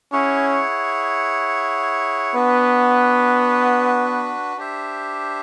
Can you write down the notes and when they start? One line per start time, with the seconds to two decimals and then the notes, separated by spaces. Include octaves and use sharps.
0.13 C#4 E4 G#4 C#5 F#5
2.35 B3 D4 F#4 B4
4.57 D4 G4 C5 E5